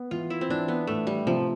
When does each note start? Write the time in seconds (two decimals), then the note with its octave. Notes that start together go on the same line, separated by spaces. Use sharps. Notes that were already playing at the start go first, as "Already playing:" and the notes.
Already playing: B3
0.11 E3 F4
0.30 E4
0.41 C4
0.50 E3 D4
0.68 B3
0.87 A2 A3
1.07 G3
1.26 C3 F3